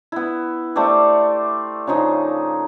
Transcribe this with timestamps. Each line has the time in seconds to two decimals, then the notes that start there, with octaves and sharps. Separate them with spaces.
0.12 B3 E4
0.76 A3 G4 C5 D5
1.87 C#3 F3 D#4